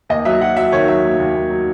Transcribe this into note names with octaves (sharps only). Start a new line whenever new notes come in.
D#2 D#5
F#3 E5
F#3 F#5
F#3 E5
D#3 C#5
F#3 E5
D#2
D#2
D#2
F#3